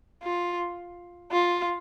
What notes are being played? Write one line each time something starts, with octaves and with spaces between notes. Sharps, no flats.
F4
F4